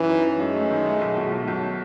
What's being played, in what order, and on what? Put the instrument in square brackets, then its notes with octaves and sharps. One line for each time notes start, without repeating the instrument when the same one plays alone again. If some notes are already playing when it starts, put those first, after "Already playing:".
Already playing: [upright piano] F#2 [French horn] E3
[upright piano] D#4
F#2
[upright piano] F#2 [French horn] G#3
[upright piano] A3
D#3
A3
B1
B2
B1
B1